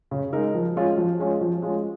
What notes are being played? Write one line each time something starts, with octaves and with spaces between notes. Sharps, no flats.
C#3
G#3 D#4 A#4
F3
G#3 C#4 F4
F3
G#3 C#4 F4
F3
G#3 C#4 F4